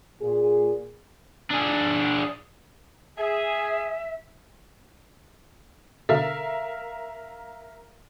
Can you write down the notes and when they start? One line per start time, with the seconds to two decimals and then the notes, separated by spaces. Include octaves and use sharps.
0.22 A#2 G#4
1.50 D4 G#4
3.18 G#4 E5
6.09 B2 D3 A4 A#4 E5 F5